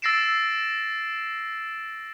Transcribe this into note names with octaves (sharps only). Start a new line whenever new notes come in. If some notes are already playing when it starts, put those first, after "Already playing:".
E6 A6 A#6 C7 D7 E7